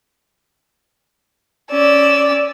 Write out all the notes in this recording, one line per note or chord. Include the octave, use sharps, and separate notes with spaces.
C#4 D5 E6